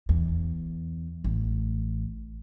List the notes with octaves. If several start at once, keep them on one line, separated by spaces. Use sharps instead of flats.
E2
A1